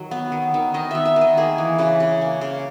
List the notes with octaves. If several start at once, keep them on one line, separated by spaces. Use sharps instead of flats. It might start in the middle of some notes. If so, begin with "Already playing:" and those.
Already playing: D#3 F#3
B3
D#3
D#3
D#3 D#5
B3 E5
E5
D#3
D#5
A#3 G#4
E3
C#3 B4
C#3
A#3
C#3